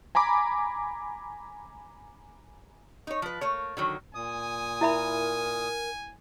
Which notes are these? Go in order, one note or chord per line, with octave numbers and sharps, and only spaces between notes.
G#5 A#5 B5 D6
D#4 C#5
F3 B4
A3 A#3 C#5
D3 D#3 F#3
A#2 G#5 D#6
E4 A#4 E5 B5